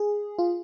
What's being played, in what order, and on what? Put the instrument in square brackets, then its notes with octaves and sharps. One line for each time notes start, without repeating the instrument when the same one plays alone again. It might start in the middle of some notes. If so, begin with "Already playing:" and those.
Already playing: [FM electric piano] G#4
F4